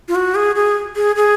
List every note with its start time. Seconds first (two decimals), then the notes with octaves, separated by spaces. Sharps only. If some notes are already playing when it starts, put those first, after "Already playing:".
0.08 F4
0.15 F#4
0.35 G#4
0.55 G#4
0.96 G#4
1.16 G#4